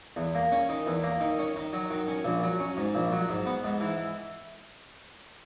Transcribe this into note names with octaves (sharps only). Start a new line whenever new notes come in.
E2
A#3
C#4
D#3
E2
A#3
D#3
C#4
D#3
F#3
D#3
C#4
A#1
F#3
C#4
G#2
A#1
F#3
G#2
B3
G#2
E3